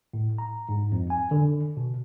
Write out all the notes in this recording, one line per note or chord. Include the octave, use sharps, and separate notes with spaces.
A2
A#5
G#2
F2
G#5
D3
B2